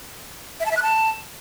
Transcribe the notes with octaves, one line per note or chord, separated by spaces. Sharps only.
E5
A5
E5
F#6
A5